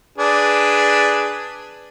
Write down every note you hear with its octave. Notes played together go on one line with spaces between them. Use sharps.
D4 G#4 B4